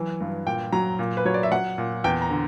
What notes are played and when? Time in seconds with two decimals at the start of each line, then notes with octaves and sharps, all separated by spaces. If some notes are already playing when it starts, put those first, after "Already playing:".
Already playing: E3 F#3
0.21 G2
0.46 A#2 G5
0.72 F#3 A#5
0.99 A#2
1.17 B4
1.25 F#3 C#5
1.34 D5
1.43 E5
1.52 F#3 F#5
1.78 A#2
2.04 E2 G5
2.22 A#5
2.30 D3